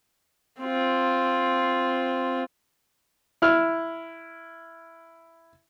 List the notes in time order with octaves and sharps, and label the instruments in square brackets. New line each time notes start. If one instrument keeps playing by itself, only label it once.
[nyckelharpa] C4 F4
[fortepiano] E4 F6